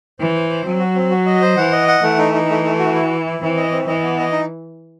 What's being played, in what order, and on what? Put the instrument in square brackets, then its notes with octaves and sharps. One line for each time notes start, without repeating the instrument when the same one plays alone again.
[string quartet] E3 [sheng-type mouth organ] C5
[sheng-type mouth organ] C5
C5
[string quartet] F#3 [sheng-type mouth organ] C4
[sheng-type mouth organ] F#4
C4
F#4
D#5
C5
[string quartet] E3 [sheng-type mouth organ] F#5
[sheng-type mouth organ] D#5
F#5
[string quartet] E3 [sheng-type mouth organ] A3
[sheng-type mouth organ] D#4
D#4
A3
A3
F#4
E4
E4
E4
[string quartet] E3 [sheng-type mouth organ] C4
[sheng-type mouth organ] D#5
C4
[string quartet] E3 [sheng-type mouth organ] D#5
[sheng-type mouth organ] B3
D#5
D#4